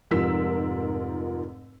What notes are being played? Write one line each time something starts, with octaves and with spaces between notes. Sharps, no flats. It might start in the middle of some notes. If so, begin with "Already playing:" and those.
F1 G#2 F3 A#4 E6 B6